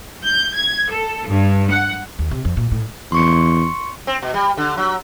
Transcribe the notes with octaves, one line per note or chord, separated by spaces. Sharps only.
G6
G#6
A4
G2
F#5
D#2
C3
F2
A#2
A2
E2 C6 C#6 C#7
C4
B2
G3
D3
F#3